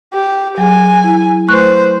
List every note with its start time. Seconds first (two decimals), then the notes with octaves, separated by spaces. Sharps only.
0.14 G4
0.58 F#3 G#4 G#5
1.04 E4
1.48 A3 B4 C5 C#6 F#6